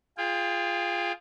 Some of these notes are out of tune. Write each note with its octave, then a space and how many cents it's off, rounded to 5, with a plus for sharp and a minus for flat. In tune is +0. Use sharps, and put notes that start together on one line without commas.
F4 -5 G#4 +0 G5 +30